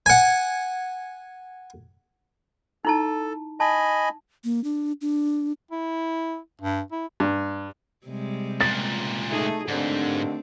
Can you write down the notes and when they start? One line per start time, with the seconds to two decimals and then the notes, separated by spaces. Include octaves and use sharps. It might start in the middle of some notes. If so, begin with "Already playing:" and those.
0.06 F#5 G#5
2.85 D#4 E4 A4 A5
3.60 D#5 G#5 A5 B5
4.44 A#3
4.64 D4
5.01 D4
5.71 E4
6.61 G2
6.92 E4
7.20 G2
8.06 C3 G3 G#3
8.61 C#2 A#2 A6
9.29 A3 D#4 G#4
9.68 D#2 G#2 D3 A3 C4 D4